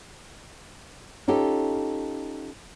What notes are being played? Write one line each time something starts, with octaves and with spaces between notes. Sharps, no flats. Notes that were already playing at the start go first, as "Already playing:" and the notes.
C#4 D#4 F4 G4 A4